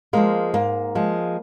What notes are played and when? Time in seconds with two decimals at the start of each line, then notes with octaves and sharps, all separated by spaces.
0.13 F3 G#3 A#3
0.54 G#2 A#3
0.95 F3 G#3